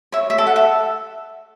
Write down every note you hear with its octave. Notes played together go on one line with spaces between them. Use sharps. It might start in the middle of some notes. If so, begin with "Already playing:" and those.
C#5 E5
E5
A4
F#5
E5